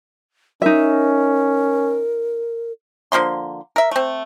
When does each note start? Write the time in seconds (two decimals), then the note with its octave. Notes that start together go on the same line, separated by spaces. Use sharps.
0.62 C#4 D#4 A#4 E5
3.12 D3 F3 A#3 C6
3.76 A#4 E5
3.91 A3 C4